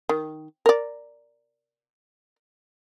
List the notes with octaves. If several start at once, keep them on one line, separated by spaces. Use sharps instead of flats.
D#3
A#4 D5